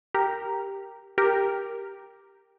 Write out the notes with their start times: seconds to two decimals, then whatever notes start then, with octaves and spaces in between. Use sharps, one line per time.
0.14 G4 A#4
1.18 G4 A#4